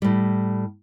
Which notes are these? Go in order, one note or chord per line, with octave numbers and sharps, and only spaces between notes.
A2 G3